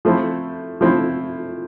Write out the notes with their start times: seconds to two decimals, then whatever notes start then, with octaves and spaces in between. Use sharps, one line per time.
0.05 F3 A3 C4 E4
0.81 F3 A3 C4 E4